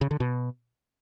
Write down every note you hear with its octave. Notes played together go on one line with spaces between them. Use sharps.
C#3
D3
B2